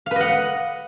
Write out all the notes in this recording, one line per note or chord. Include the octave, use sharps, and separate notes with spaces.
B4 D#5 F5 F#5